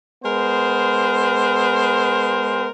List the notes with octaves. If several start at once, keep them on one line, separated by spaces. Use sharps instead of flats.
G#3 B3 A#4 C5